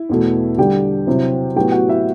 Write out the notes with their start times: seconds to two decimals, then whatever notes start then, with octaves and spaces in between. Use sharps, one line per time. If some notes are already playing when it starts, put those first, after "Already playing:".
Already playing: E4
0.09 E2 B2 A3
0.58 D3 G3 D4 G4 G5
1.07 C3 F#3 C4 E4
1.56 A2 F#3 B3 G4 G5
1.72 F#4 F#5
1.89 E4 E5